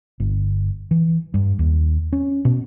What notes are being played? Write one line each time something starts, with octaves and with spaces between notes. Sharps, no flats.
G1
E3
G2
D#2
C#4
B2